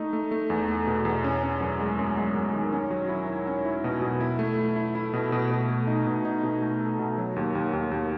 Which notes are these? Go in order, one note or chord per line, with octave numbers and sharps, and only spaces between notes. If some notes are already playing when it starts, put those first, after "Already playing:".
Already playing: A3 D#4
A3
A3
E2
A3
B2
E2
C#4
C#4
F#2
G#3
F#2
G#3
F#2
D#3
C#4
F#3
E4
C#4
C#4
E4
B2
B2
E4
A3
E4
E4
E4
B2
B2
B2
A3
D#4
B2
D#4
B2
A3
A4
B2
F#3
D#2
D#2
D#2
D#2